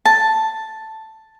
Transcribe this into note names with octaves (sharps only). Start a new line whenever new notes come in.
A5